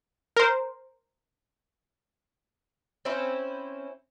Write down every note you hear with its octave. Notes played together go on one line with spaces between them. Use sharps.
A#4 C5
C4 C#4 E4 C5